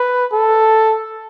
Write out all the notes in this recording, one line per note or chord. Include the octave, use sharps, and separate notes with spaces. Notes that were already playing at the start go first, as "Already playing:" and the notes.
Already playing: B4
A4